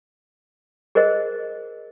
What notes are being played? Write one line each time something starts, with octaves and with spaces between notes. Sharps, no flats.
G#4 A#4 C5 D#5